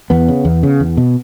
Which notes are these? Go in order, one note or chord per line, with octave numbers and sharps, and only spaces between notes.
E2 B3
C#3
E2
C#3
E2
B2